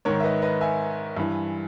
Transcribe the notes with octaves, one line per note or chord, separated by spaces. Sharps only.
G#2 D#3 A#4 C#5
E5
B4 D#5
B4 D#5
E5 G#5
G2 E3